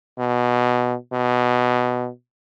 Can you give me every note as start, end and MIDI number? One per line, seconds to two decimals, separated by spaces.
0.18 0.95 47
1.12 2.08 47